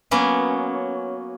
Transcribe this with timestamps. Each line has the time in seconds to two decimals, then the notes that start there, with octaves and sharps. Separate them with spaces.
0.11 F#3 A#3 B3 C#4